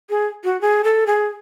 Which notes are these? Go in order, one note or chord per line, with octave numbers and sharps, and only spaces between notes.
G#4
F#4
G#4
A4
G#4